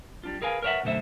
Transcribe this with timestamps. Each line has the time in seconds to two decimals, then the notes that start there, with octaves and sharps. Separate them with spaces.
0.24 G3 D4 F4
0.42 G#4 A#4 B4 F5 G#5
0.63 A#4 B4 C#5 D5 E5 F#5
0.83 F#2 B2 D3 A3 C5 E5